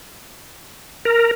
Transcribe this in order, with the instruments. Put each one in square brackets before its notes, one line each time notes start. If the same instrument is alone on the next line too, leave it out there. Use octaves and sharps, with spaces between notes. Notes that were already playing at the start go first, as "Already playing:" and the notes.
[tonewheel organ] A#4